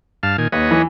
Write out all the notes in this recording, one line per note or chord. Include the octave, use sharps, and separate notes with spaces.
G2 F5 A5
A#2 D#3 G#5
D#2 B4 C#5 D#5
E3